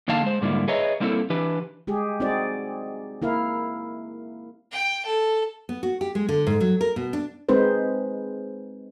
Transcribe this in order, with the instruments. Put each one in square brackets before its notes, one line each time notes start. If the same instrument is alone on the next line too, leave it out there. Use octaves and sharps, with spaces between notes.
[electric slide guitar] E2 D3 A#3 D#4 F5 A5
G#3 C5
G#2 D3 G3 A#3 E4 F4
G#4 B4 C#5 D#5 E5 A#5
G3 A#3 C4 E4 F4 A4
E3 D4 G4 B4
[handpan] G#3 G4 G#4
C4 D#4 F#4 G#4 D5
A#3 E4 A#4 F5
[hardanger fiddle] G5
A4
[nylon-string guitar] B3
F#4
G4
G#3
D3
G#2
F#3
A#4
B2
D4
[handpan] G#3 C4 D#4 B4 C5